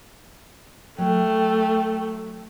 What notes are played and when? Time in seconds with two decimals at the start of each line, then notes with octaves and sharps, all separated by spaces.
0.98 F#3 A3 G5